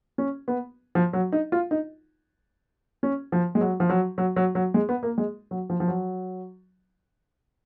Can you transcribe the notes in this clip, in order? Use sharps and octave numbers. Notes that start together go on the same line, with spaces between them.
C#4
B3
F3
F#3
D#4
F4
D#4
C#4
F3
G#3
F#3
F3
F#3
F#3
F#3
F#3
G#3
B3
A#3
G#3
F#3
F3
F3
F#3